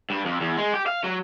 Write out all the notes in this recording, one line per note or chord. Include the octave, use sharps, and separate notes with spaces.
G2
F2
E2
G#3
G4
F5
F#3